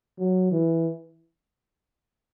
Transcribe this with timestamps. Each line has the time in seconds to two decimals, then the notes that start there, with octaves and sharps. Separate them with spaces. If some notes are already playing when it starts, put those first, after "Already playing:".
0.18 F#3
0.52 E3